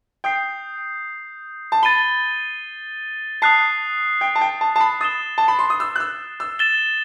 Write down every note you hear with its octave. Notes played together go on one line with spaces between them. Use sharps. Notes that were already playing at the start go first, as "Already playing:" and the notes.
G5 D#6 G6 C7
A5
B5 A6 D#7 G7
A5 D#6 F#6 C7
G5
A5
G5
A5
A5
B5
D#6 A6 E7 G7
A5
B5
C6
D#6
E6
F#6
E6
E6
A6 E7 G7